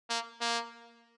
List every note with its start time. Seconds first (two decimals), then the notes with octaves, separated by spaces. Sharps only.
0.10 A#3
0.41 A#3